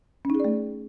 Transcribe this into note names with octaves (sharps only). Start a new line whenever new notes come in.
A3 C#4 D#4 G#4 D5